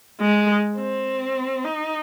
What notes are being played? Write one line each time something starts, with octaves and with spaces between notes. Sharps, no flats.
G#3
C4
D#4